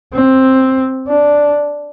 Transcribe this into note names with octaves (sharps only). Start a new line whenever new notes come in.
C4
D4